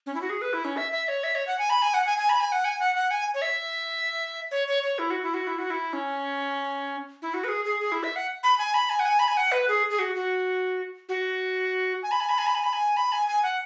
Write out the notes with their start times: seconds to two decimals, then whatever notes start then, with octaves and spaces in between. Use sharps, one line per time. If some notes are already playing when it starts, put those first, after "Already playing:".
0.06 C#4
0.15 E4
0.22 F#4
0.30 G#4
0.41 B4
0.53 E4
0.65 C#4
0.77 E5
0.92 E5
1.08 C#5
1.24 E5
1.35 C#5
1.47 F#5
1.58 G#5
1.70 B5
1.82 G#5
1.94 F#5
2.06 G#5
2.18 G#5
2.29 B5
2.40 G#5
2.52 F#5
2.65 G#5
2.80 F#5
2.95 F#5
3.11 G#5
3.34 C#5
3.42 E5
4.51 C#5
4.68 C#5
4.83 C#5
4.99 E4
5.10 F#4
5.23 E4
5.34 F#4
5.47 E4
5.58 F#4
5.70 E4
5.93 C#4
7.22 E4
7.34 F#4
7.44 B4
7.48 G#4
7.65 G#4
7.80 G#4
7.92 E4
8.03 E5
8.16 F#5
8.43 B5
8.58 G#5
8.74 B5
8.90 G#5
9.00 F#5
9.05 G#5
9.19 B5
9.28 G#5
9.37 F#5
9.52 B4
9.68 G#4
9.90 G#4
9.99 F#4
10.15 F#4
11.09 F#4
12.03 G#5
12.11 B5
12.20 G#5
12.29 B5
12.38 G#5
12.47 B5
12.55 G#5
12.64 B5
12.73 G#5
12.97 B5
13.12 G#5
13.27 G#5
13.43 F#5